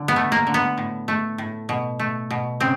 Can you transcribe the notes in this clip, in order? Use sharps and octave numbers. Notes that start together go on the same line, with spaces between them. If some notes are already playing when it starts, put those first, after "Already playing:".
Already playing: D3
B3
A3
A#3
D3
B3
A2
A3
A2
B2
A3
B2
C#3 C4